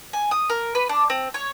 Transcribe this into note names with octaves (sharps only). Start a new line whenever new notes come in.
G#5
D#6
A#4
B4
D4
C4
C#5